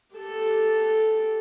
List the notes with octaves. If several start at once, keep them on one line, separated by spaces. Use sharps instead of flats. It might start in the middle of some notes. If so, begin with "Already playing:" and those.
G4 A4